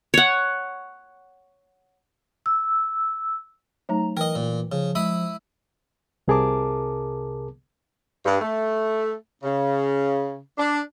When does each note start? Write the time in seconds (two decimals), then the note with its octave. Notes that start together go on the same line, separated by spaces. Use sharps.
0.14 C#5 F#5
2.46 E6
3.89 F#3 A3 D#4 A#5
4.17 E3 A#4 D#5 G5
4.36 A#2
4.72 C#3 F3
4.95 G#3 E4 B5 D#6
6.28 C2 C3 G#4 A#4 A5 D6
8.25 G2
8.41 A3
9.43 C#3
10.58 D4